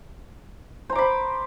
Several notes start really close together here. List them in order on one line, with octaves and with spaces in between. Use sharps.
C5 A#5 D6 B5